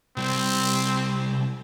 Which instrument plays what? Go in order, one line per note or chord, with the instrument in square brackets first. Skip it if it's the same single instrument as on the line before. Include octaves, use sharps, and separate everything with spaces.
[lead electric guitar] C2 G3 [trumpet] C4